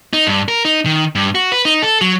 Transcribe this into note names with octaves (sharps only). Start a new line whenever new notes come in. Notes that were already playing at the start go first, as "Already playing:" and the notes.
D#4
G2
A#4
D#4
D#3
G2
F#4
B4
D#4
A4
F#3